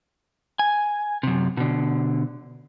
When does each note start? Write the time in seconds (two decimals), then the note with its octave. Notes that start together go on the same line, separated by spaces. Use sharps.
0.59 G#5
1.23 F#2 C3
1.57 B2 D3